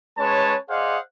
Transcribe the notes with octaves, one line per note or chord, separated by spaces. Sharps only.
G#3 C#4 B4 C#5 A5
G#4 C5 D5 D#5 F5 F#5